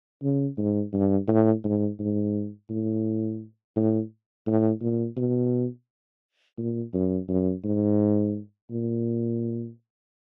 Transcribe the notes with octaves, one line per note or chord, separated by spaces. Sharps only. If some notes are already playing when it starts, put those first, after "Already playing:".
C#3
G#2
G2
A2
G#2
G#2
A2
A2
A2
A#2
B2
A#2
F#2
F#2
G#2
A#2